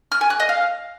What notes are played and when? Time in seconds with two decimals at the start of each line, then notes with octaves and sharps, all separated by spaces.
0.12 F6
0.21 G#5
0.30 F#6
0.40 D#5
0.49 F5